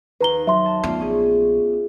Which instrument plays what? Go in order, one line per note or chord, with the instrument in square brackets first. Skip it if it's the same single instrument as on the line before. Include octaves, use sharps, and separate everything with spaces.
[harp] D#2 [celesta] B4 A#5 G7
[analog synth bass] F#3 [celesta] E5 C6
[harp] A5
[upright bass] A3 B3 [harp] F4 D5
[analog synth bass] A#1 [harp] C#4 G#4